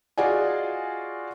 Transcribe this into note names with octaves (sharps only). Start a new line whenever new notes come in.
F4 F#4 G#4 D5 D#5 G#5